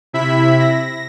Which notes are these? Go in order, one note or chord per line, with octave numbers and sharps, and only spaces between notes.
C3 E4 E5 B5 B6
A#6